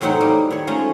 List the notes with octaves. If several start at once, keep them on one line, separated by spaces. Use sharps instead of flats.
E2 A2 F#3 C4 D#4 F#5
G3 A#3
D#3 C#5
F3 G#3 A3 C#4 A#5